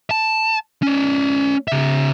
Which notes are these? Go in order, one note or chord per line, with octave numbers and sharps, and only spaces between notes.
A5
C#4 D5
C#3 E5